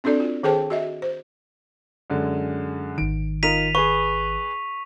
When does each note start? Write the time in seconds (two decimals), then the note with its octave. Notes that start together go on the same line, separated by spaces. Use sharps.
0.04 C4 D4 F#4 A4 D5
0.20 F4
0.43 D#3 G#4 A4 C5 G5 A5
0.70 F#4 D#5 E5
1.02 C5
2.10 F#2 D3 G#3
2.98 G#1 D#3 D7
3.43 D#4 F4 A#4 B6 D#7 F7
3.75 G#4 B4 C#6